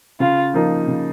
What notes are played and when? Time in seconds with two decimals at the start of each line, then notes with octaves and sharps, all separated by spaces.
0.20 C#3 F4
0.54 F3 A#3 D#4
0.88 C#3